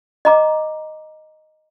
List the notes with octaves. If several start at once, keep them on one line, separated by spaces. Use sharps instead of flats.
D#5 A#5 D6